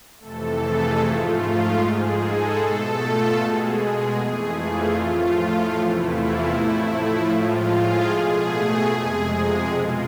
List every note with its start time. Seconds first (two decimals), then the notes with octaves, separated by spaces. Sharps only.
0.20 F2 C3 E3 A3 A4
0.59 G#4
0.99 G#2 F3 A3 F4
1.77 G#2 G#3 G#4
2.17 A4
2.56 B2 A3 A4
2.97 F4
3.36 B2 G#3 G#4
3.75 G#4
4.15 F2 E3 A3 G#4
4.54 F4
4.94 A2 F3 A3
5.73 E2 C3 E3 A3 E4
6.12 F4
6.51 A2 F3 A3 E4
7.31 A2 F3 G#3 F4
7.70 G#4
8.09 B2 A3 G#4
8.88 F2 C3 G#3 G#4
9.28 G#4
9.67 B2 G#3 F4